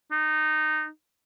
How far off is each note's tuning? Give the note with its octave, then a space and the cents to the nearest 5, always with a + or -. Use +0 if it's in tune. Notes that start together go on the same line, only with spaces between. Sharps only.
D#4 -15